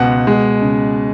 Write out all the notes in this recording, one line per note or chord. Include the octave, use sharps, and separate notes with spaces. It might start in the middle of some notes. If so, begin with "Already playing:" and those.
Already playing: C#2 B2 F#5
G#3
C#3